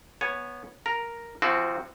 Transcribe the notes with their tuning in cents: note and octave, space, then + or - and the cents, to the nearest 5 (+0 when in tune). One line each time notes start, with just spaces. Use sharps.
B3 -10 C#5 +0 G#5 +0
A#4 +0 A#5 +0
F3 -35 C4 +0 F#4 -5